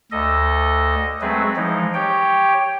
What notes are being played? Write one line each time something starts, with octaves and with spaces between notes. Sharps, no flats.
D2 A4 D#5
F#3 G#3 A3 C4 G#4 B4
E3 F3 G#3 D#4
G4 C#5 G5